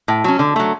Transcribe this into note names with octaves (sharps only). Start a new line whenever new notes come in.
A2
F#3 C#4
D3
F#3 A3